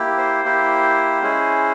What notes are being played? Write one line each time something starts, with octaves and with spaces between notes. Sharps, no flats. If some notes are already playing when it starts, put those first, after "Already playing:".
Already playing: A#3 E4 G4
C5
A#3 E4 G4
G#3 C#4 E4 G#4